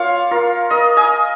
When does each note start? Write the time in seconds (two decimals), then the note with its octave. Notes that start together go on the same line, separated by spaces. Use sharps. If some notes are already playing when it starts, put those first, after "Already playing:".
Already playing: A#3 F4 C#5 F5
0.31 F4 A#4
0.70 A#4 D#5
0.97 D#5 G#5